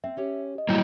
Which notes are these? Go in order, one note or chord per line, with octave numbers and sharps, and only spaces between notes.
C4 E5
C#4 G4 C#5
G4 D#5
A2 F#3 G3 A#3 E4 A5 G6 A#6